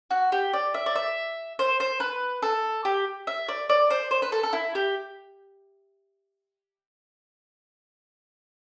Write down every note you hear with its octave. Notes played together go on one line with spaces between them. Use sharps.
F#4
G4
D5
E5
D5
E5
C5
C5
B4
A4
G4
E5
D5
D5
C5
C5
B4
A4
A4
E4
G4